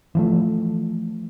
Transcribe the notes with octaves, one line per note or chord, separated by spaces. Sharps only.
E3 F3 A3